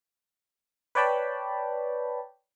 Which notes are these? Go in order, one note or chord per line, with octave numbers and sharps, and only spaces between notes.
B4 C#5 D5 G5 A5 B5